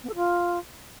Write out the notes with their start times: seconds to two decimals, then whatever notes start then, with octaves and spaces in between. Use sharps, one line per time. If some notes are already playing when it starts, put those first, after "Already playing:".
0.04 B3
0.09 A4
0.15 F4